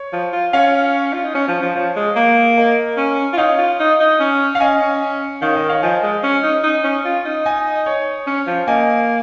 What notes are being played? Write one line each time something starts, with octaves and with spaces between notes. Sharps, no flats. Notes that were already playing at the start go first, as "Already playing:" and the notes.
Already playing: C#5
F3
F4
C#4 C#5 F5
F4
D#4
C#4
F3
F3
F3 C#5
G#3
A#3
A#4 D#5
C#4
F4
D#4 C#5 F5
F4
D#4
D#4
C#4
F5
C#4 D#5 G#5
C#4
D#3 C#5 F5
A#4 D#5
C#5 F5
F3 D#5 G#5
G#3
C#4
D#4
D#4
C#4
F4
D#4
D#5 G#5
C#5
C#4
F3
A#3 D#5 G#5